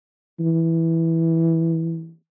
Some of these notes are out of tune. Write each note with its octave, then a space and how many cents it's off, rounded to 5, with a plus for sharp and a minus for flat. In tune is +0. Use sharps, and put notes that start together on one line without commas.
E3 -5